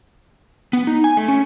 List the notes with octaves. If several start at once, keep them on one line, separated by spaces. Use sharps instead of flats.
B3
D#4
G#5
A3
C#4